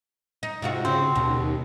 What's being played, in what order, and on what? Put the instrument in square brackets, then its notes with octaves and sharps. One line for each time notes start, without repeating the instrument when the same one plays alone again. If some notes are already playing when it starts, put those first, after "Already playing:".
[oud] D#4
[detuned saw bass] G#2 [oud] C3 F4 F#4
[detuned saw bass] C#3 [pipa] C4
[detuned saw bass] D#2 [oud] B2